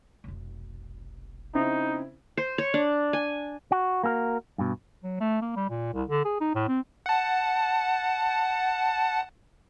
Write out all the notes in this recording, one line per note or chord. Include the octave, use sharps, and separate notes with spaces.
F1 B1
C#3 C4 D#4 E4
C5
C#5
D4
G#5
F#4
A#3 F#4 A4 A#4
G2 B2
F#3
A3
A#3
G3
A#2
C2
D3
G#4
D#4
A2
C4
F#5 A5